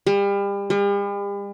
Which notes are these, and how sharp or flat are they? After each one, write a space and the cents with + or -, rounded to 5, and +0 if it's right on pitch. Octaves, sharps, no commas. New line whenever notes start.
G3 +35
G3 +45